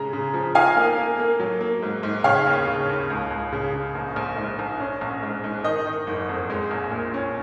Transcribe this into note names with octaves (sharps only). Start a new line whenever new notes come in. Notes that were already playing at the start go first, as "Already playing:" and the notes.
Already playing: C#3 G#3 A#5
C#3
F3
D#4 F5 G#5
A#3
A#3
A#3
F#3
A#3
G#2
G#2
C#3 C#5 F5
D#2
C#3
D#2
C#2
C#2
C#3
C#3
A#1
A#1
G#2
A#1
C#4
A#1
G#2
G#2
D#3 D#5
D#3
F#1
F2
G#3
A#1
A#2
C#4